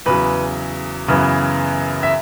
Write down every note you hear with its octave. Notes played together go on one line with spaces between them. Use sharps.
E2 C#3 F#3 B4
F#2 C#3 E3 B3
E5